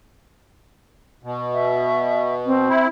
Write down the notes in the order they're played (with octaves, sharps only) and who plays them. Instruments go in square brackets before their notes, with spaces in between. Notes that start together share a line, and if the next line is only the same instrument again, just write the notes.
[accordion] B2
[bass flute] E5
C4
[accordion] E4